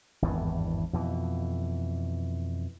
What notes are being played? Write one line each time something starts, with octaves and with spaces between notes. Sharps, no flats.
G#1 E2 G2 E3
F2 B2 E3